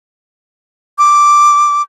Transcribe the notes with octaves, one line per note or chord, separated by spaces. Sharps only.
D6